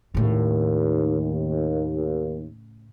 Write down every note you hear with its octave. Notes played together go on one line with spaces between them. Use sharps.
D#2 A2 C#3